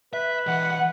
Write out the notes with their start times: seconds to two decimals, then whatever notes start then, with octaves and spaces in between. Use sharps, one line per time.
0.13 B4 E5
0.47 E3 D#5 F#5